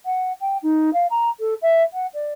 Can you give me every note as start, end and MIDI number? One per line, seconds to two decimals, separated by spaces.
0.05 0.33 78
0.41 0.58 79
0.63 0.93 63
0.93 1.07 77
1.10 1.30 82
1.40 1.54 69
1.62 1.82 76
1.93 2.07 78
2.14 2.33 74